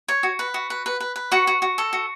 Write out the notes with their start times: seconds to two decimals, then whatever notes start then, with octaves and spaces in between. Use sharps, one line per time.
0.08 C#5
0.23 F#4
0.39 B4
0.54 F#4
0.70 B4
0.86 B4
1.00 B4
1.16 B4
1.32 F#4 C#6
1.47 F#4
1.62 F#4
1.78 A4
1.93 F#4